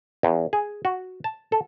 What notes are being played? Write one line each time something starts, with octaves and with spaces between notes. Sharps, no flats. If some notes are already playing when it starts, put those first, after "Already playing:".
E2
G#4
F#4
A5
A4